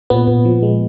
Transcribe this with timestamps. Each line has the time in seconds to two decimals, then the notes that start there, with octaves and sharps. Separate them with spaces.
0.10 A#2 B3
0.28 A#2
0.45 F3
0.63 G#3